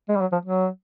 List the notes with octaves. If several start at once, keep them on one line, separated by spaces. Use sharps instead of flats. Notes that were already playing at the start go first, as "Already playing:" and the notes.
G#3
G3
F#3
F3
F#3